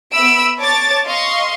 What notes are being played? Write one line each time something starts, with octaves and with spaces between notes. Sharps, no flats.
B3 E5 B5 E6 D7
C#5 A5 D6 A6
D#5 F5 C6 C#6